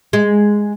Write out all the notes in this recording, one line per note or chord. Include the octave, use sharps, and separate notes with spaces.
G#3